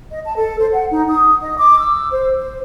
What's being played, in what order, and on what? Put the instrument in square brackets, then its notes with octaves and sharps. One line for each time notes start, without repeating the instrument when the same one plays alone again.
[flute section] D#5
A5
A4
C5
F#5
D#4
D#6
D#5
D6
E6
C5
C5